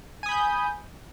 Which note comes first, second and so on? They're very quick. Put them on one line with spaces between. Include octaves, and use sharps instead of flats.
G#5 D#6 B5 G6